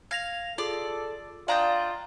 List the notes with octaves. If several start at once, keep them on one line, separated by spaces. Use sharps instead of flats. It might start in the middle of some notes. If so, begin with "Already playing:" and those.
F5 G#6 A#6 F7
F4 G#4 A4 D5 D6
D4 F4 D5 D#5 F5 G5 A#5